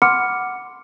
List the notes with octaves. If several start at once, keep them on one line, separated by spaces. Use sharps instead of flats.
F#5 B5 C6 D6 F6 C#7